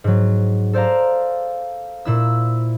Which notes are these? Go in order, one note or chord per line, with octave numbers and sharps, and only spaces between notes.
G#2 F#3
A4 C5 D5 F5 A#5
A#2 E4 E6